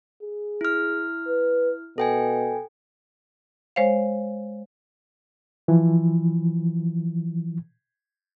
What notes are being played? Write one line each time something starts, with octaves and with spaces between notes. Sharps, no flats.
G#4
E4 F6
B4
B2 A4 G5 G#5
G#3 C5 C#5 F5
E3 F3